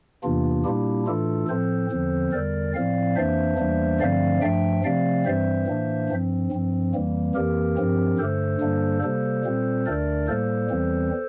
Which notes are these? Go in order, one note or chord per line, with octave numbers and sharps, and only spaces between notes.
E2 C3 E3 A#3 D4 F4
A#2 G3 A#3 D4 E4 G4
A2 E3 A3 D4 F4 A4
A2 F3 C4 A4 C5
E2 D3 F3 C4
E2 D3 G3 A#4 D5
A2 F3 C4 D5 F5
F2 E3 A#3 D4 C5 E5
E2 E3 G3 A#3 D4
G2 D3 F3 A3 C4 D5 F5
G2 F3 A3 D4 E5 G5
C3 F3 A3 C4 D5 F5
G2 E3 G3 C4 C5 E5
A2 E3 A#3 D4
G2 F3 C4
G2 F3 C4
F2 E3 G3 A#3
F2 E3 A#3 G4 A#4
G2 F3 C4
G2 D3 A3 A4 C5
G2 D3 G3 A#3 D4
C3 G3 A#3 A4 C5
A#2 G3 C4
D2 D3 A3 D4 A#4 D5
A2 G3 A#3 A4 C5
E2 E3 G3 C4